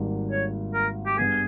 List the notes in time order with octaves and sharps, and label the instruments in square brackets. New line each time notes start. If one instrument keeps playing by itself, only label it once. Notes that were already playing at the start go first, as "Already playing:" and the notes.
Already playing: [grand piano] G#1 G#2 G3 A#3
[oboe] C#5
A#4
G4
[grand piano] G2 G3 B3 [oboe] G#4